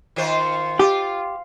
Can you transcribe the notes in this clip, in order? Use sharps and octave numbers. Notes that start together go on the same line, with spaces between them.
D#3 F4 C5
F4 G4